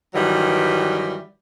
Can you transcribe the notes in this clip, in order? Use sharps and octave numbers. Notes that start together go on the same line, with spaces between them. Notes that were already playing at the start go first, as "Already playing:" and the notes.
G2 D#3 E3 F#3 G3